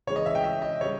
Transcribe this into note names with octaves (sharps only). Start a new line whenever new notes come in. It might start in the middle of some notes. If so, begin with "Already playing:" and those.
C#3 E3 G#3 C#5
D#5
E5
G5
E5
D#5
C#3 G3 C#5